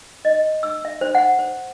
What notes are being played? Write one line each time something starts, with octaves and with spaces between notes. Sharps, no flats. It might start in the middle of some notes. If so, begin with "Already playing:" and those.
D#5
E6
E5
C5
F#5
C5